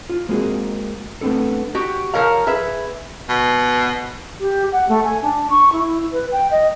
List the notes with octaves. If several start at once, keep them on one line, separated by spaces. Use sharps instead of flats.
F4
G#3 A#3 C4 F#4 G#4
A3 B3 C4 D4 A4
F#4 G4
F3 A#4 C#5 F5
G#4 B4 E5
B2
G4
F#5
A3
G#5
D4
C#6
E4
B4
G5
D#5